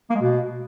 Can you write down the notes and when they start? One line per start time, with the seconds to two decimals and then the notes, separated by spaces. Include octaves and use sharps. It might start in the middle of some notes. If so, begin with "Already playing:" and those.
0.10 A#3
0.15 G#3
0.21 B2